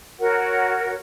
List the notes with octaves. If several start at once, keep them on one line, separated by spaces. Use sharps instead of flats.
F#4 A#4 C#5 F#5